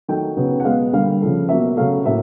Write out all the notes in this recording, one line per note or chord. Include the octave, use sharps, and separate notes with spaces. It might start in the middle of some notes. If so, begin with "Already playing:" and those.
D#3 F#3 A3 G5
C#3 F#3 B3
F#5
B2 G#3 B3 F5
D3 G3 A#3 F5
C#3 F3 A3
B2 F#3 A#3 E5
C#3 F#3 A3 F5
A2 F#3 A#3 E5